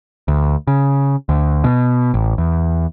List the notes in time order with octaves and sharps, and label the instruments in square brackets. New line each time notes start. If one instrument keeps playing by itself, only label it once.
[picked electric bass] D2
C#3
D2
B2
A1
E2